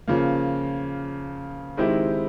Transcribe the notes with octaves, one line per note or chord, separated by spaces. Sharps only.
C#3 F3 A#3
D#3 G#3 C4 E4 G4